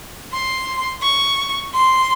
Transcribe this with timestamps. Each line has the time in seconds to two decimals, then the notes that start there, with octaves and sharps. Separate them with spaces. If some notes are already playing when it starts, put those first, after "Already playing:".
0.33 C6
1.03 C#6
1.74 C6